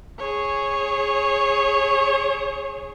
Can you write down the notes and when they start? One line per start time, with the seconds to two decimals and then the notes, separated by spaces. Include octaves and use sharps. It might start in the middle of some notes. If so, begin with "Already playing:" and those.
0.19 G#4 C#5